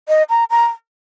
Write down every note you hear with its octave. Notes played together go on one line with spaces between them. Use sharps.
D#5
A#5
A#5